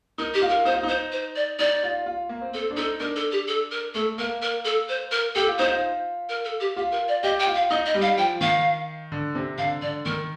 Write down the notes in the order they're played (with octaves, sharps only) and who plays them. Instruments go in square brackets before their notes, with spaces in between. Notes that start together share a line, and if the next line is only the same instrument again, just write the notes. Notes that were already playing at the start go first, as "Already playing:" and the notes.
[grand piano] D#4 [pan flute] A#4
[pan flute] G4
[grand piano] F4
[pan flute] A#4
[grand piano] D#4 [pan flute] C5
[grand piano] F4
D#4
[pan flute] C5
C5
D5
[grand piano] D#4 [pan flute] D5
[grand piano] F4
F4
A#3
C4
[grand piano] C4 [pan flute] A4
[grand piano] D4
[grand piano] D#4 [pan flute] A4
[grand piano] D4 [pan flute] A#4
[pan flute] A4
G4
A4
A#4
[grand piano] A3 [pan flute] A4
[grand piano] A#3 [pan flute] A#4
[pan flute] A#4
A4
C5
A#4
[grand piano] G4 [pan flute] A4
[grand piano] F4
[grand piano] D#4 [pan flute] C5
[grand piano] F4
[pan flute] A#4
A4
G4
[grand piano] F4 [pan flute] G4
[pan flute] A#4
D5
[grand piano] G4 [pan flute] D#5
[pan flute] G5
[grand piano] F4
[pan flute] F5
[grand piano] D#4 [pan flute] D#5
[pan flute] D#5
[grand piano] G3
[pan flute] F5
[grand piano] F3 [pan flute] G5
[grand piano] D#3 [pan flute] F5
[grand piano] D3
C3
[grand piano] D3 [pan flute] F5
[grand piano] D3 [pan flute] D5
[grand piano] D#3 [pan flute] A#4